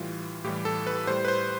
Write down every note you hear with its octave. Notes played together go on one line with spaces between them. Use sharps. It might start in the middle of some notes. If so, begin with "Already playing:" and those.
Already playing: A2 E3 G3 F4
A2 E3 G3 G4
A4
B4
A2 G3 C5
B4
C5